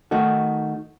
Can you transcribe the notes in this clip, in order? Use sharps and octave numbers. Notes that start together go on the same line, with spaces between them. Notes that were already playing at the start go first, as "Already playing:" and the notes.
D#3 A3 D#4 F#4